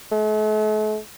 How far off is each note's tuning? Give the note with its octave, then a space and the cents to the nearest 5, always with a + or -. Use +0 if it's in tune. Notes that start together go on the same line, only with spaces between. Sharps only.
A3 -45